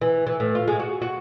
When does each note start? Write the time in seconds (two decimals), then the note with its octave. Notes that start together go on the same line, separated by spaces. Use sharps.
0.02 E3
0.27 E3
0.40 A2
0.55 F4
0.68 G#3
0.79 F#4
1.02 F#4